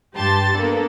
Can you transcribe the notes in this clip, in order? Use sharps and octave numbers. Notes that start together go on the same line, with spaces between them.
G2 G4 A5 C6 A6
A#3 B3 D4 A4